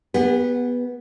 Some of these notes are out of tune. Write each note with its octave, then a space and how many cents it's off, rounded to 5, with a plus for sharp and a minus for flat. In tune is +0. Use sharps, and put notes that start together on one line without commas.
B3 -10 G4 +45